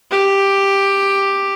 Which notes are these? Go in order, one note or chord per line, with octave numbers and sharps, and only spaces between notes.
G4